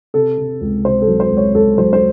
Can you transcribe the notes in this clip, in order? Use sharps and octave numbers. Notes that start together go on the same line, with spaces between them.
C3 A4
C3
C#2
C3 C5
A4
F#3
C5
C#2
C#5
C#2 A4
F#3 C5
C5